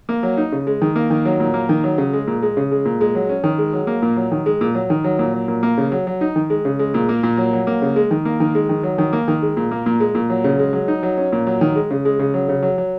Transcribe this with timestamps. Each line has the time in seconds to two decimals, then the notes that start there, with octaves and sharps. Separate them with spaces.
0.09 A#3
0.23 F#3
0.37 D#4
0.52 C#3
0.67 G#3
0.82 D#3
0.96 A#3
1.10 D#3
1.25 F#3
1.40 A#2
1.54 A#3
1.69 D#3
1.84 F#3
1.98 C#3
2.13 G#3
2.27 A#2
2.42 G#3
2.57 C#3
2.71 G#3
2.85 A#2
3.01 G#3
3.15 F#3
3.29 C#4
3.44 D#3
3.58 G#3
3.73 F#3
3.87 A#3
4.02 A#2
4.16 F#3
4.32 D#3
4.46 G#3
4.61 A#2
4.75 F#3
4.90 D#3
5.04 F#3
5.19 A#2
5.33 F#3
5.48 A#2
5.63 A#3
5.77 C#3
5.92 F#3
6.07 F#3
6.21 D#4
6.36 D#3
6.50 G#3
6.65 C#3
6.79 G#3
6.94 A#2
7.09 A#3
7.23 A#2
7.38 F#3
7.53 F#3
7.67 A#3
7.82 C#3
7.96 G#3
8.11 D#3
8.25 A#3
8.40 D#3
8.55 G#3
8.69 D#3
8.83 F#3
8.98 D#3
9.13 A#3
9.28 D#3
9.42 G#3
9.57 A#2
9.71 A#3
9.86 A#2
10.00 G#3
10.15 A#2
10.30 F#3
10.44 C#3
10.59 G#3
10.73 F#3
10.88 D#4
11.03 F#3
11.18 C#4
11.32 A#2
11.47 F#3
11.61 D#3
11.76 G#3
11.91 C#3
12.05 G#3
12.19 C#3
12.34 F#3
12.49 C#3
12.63 F#3
12.78 F#3